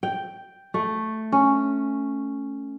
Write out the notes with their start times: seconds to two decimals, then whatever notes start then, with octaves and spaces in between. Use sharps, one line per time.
0.03 G5
0.74 A3
1.32 C#4